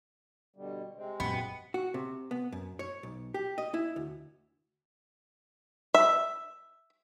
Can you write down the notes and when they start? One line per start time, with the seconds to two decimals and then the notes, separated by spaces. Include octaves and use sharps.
0.56 B2 D3 G3
0.95 C3 G#3 C4
1.20 F#2 A#2 B3
1.74 F#4
1.94 C3
2.31 B3
2.52 F#2
2.79 C#5
3.03 B1
3.34 G4
3.58 D#5
3.74 E4
3.96 D2
5.94 E5